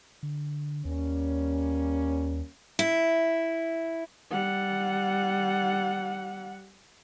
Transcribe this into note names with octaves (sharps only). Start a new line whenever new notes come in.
D3
D#2 G3 A#3 C#4
E4
G3 F#5